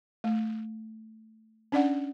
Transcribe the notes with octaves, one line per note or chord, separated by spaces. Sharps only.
A3
C#4 D4 D5 F#5